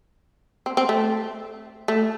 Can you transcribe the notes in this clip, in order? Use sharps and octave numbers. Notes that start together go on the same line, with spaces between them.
C4
C4
A3
A3